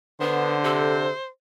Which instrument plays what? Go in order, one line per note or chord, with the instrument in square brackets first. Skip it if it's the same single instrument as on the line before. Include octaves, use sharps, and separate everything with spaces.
[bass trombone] D3 [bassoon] B3 [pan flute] D4 [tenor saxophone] C5
[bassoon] C3 [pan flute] A4